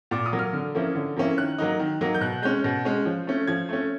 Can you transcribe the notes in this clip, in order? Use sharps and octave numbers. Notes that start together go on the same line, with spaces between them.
A#2 D6
D#6
F#3 A#3
F6
D3
F3 A#3 C#4 E4
D3
F3 A#3 C#4 E4
D#3 F#6
F#3 A#3 D#4
D#3
F#3 A#3 D#4
G6
B2 F#6
G#3 C#4 G6
B2
G#3 C#4
F3
A3 C#4
F3 G#6
A3 C#4